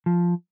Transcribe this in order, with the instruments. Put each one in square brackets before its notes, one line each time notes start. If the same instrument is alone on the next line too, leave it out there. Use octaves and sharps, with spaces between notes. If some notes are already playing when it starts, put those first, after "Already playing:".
[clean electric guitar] F3